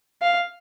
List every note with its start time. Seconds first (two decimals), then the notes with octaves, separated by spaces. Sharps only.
0.22 F5